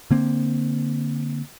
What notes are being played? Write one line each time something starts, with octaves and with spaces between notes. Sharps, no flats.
D3 A#3 C4